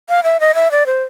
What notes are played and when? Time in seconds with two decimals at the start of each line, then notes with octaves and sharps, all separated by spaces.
0.09 F5
0.24 E5
0.40 D#5
0.55 E5
0.71 D5
0.86 C5